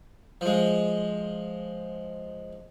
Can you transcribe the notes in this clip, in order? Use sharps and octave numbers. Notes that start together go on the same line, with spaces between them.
F3 G#3